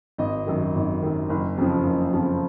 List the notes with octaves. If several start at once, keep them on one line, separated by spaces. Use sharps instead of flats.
G#1 D#5
F#2 D#3
G#1
F#2 D#3
F#1
F2 C#3 F3
F#1
F2 C#3 F3